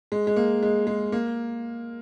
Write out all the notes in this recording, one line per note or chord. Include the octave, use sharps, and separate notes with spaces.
G#3
G#3
A#3
G#3
G#3
A#3